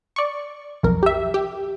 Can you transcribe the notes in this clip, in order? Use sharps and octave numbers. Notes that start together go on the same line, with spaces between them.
D5 C#6
B1 F2 A#4
G4 E5
G4